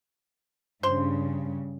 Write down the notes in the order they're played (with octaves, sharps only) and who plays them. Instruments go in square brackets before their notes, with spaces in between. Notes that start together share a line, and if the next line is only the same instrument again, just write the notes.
[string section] G2 C#3 [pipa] C5 C6